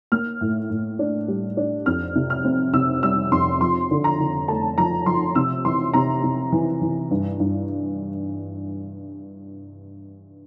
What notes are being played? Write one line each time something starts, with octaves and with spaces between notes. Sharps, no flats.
A#3 F6
A2
A2
D4
G3
D4
F2 F6
C3
F6
C4
C3 E6
G3 E6
F2 C6
F3 C6
D3
A#5
D3
A3 A5
F3 A#5
F3 C6
C3 E6
E3 C6
C3 A#5
C3
E3
E3
G2
G2